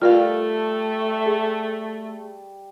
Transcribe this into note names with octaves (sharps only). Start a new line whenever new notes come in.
G3 A3 F4 A#4 F5
G#4